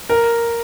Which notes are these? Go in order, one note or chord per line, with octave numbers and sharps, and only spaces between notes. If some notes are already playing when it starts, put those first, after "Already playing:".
A#4